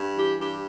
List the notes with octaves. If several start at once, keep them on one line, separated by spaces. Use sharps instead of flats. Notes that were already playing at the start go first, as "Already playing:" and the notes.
Already playing: G2
E3 G4
G2 G4